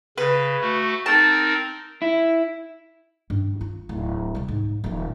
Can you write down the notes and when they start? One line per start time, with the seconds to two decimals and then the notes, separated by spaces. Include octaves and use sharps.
0.18 C#3 B4
0.61 A3 F#4
1.06 C4 D#4 A#4 A5
2.02 E4
3.30 G2
3.61 F4
3.89 D1
4.35 C3 G3
4.48 G#2
4.84 D#1 F3